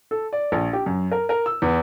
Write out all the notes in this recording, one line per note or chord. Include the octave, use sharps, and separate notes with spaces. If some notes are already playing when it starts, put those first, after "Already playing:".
A4
D5
A#1
G4
F#2
A#4
A#4
E6
E2